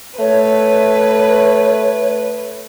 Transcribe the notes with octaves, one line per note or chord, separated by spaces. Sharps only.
A3 B4 C#5